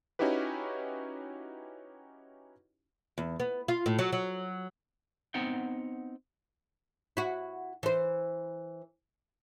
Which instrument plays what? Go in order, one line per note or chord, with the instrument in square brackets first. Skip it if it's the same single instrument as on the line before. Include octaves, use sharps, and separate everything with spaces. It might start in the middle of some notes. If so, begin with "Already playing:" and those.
[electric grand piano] C#4 D#4 E4 F#4 G4 B4
[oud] E2
B3
F4
A2
F#3
F#3
[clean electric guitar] B3 C4 D#4 F#5 G5
[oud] E4 F#4
E3 C5